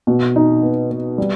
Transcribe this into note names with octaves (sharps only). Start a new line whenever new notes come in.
B2
D#4
B3
B3
G3